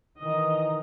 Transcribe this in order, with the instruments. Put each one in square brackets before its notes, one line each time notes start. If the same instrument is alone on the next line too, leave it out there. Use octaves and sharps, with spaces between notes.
[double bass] D#3 E3 [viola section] D#5 A#5 [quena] D#6